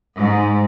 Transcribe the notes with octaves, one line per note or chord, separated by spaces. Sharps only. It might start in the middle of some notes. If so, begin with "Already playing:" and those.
G#2